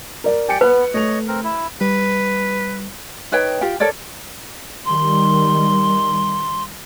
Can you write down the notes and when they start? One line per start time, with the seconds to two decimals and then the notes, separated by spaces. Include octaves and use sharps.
0.24 A#4 D5
0.48 G4 D5 G5 G#5 C#7
0.61 B3 B4 F#6
0.94 A3 C#5 D#5 F7
1.28 C4 A#4
1.44 E4
1.81 G3 B4
3.32 D#4 B4 C#5 G5
3.61 F4 G4 G5
3.80 A4 A#4 C#5 D5
4.85 D#3 G3 C6